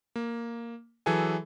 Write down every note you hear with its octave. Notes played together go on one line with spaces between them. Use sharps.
A#3
E3 F#3 G#4 A4 G#5